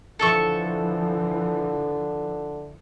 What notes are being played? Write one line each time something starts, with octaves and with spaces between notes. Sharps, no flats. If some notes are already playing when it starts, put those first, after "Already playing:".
D3 E3 F3 A4 E5 C#6